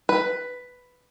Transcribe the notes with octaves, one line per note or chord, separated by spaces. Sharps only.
B4